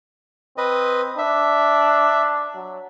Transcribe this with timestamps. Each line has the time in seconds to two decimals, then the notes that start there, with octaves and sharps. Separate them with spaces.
0.58 C4 B4 D#5
1.18 D4 E5
2.56 F#3